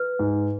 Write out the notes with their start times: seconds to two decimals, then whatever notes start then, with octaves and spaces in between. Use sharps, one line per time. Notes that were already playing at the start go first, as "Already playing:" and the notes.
Already playing: B4
0.19 G#2